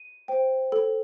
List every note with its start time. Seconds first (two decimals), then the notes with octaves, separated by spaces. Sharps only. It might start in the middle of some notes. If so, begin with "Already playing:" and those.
Already playing: D#7
0.28 C5 G5
0.72 A4